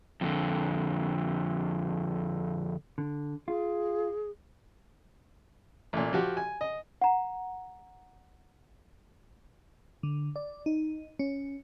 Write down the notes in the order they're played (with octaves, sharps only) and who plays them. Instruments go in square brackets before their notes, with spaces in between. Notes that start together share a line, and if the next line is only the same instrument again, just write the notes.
[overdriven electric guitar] F2 D3
[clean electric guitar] D3
[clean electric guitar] F4 [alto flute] G#4
[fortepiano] A1 A#2
F3 F#4 G4
G#5
D#5
[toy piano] F#5 A#5
[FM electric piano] D3
D5
D#4
C#4